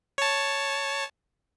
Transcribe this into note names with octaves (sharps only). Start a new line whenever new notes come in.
C#5 A5